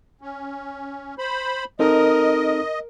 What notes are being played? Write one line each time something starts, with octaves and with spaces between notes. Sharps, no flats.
C#4
C5 B5
C4 D#4 A4 A#4 D#5